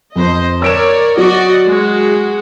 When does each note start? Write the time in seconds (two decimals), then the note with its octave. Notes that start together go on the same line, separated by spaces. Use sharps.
0.16 F2 C5 D#5
0.62 A#4 C#5 D5 E6 D7 E7
1.17 F#3 F#4 D5 D#5
1.65 G#3 F#4